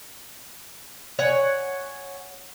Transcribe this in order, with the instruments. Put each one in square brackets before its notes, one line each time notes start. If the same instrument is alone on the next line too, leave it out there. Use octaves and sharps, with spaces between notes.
[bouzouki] C#5 F#5 G#5